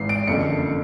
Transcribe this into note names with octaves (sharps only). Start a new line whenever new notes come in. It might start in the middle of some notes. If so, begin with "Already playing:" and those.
Already playing: G#1 G#2 E3 C7
D7
F#1 F2 D3 C#7